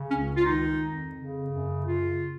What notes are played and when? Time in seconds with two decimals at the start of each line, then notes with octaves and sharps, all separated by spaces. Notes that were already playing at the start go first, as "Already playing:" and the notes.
Already playing: C#3
0.09 C#2 C#4
0.35 F4
0.43 D#3 D#4
0.80 F2
1.14 C#3
1.49 F#2
1.84 C#3 F4